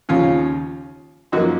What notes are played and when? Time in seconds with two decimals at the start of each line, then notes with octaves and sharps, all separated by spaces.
0.09 D#2 C#3 F3 C#4 F4
1.32 F#2 F3 A#3 D#4 F#4